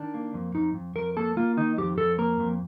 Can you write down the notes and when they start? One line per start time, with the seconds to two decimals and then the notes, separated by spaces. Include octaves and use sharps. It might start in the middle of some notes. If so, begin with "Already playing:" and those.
Already playing: D#3 D4
0.14 A#3
0.34 F2
0.55 F2 D#4
0.75 F2
0.96 F2 A#4
1.17 A#3 A4
1.37 A#3 F4
1.57 D#3 D#4
1.78 F2 G4
1.98 F2 A4
2.18 A#3 A#4
2.40 F2